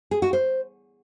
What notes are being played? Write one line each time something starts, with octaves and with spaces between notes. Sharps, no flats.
G#4
F#4
C5